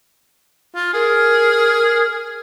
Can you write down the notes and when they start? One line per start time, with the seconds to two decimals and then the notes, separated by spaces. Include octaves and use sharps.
0.75 F4
0.94 G#4 A#4